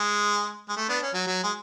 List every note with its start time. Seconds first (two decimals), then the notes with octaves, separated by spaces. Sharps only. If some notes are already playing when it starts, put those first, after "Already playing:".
Already playing: G#3
0.69 G#3
0.77 A3
0.89 B3 D4
1.02 C#4
1.14 F#3
1.27 F#3
1.44 G#3